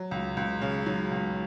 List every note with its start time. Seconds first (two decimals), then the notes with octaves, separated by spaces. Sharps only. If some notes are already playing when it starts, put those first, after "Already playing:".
Already playing: F#3
0.11 C#2
0.37 C#2
0.62 C#3
0.86 F#3
1.11 C#2